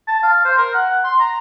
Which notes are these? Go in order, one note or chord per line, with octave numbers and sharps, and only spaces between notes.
A5
F5
C5
A#4
F#5
C6
A#5